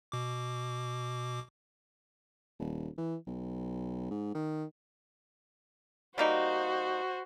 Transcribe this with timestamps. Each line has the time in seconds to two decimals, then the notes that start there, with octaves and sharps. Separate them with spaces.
0.12 B2 D6
2.59 D#1
2.98 E3
3.27 B1
4.11 G#2
4.35 D#3
6.18 G3 A#3 D#4 F#4 C5